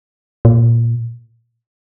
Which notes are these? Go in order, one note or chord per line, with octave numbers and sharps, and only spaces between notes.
A#2